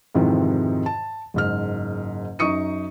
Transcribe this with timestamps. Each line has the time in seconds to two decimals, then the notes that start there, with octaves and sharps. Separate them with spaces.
0.15 F2 G#2 C3 D#3 E3
0.86 A5
1.34 F#1 G#2 F6
2.39 F#2 D#4 C#6 D#6 C#7 D#7